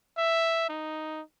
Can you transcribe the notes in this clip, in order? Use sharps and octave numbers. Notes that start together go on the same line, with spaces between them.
E5
D#4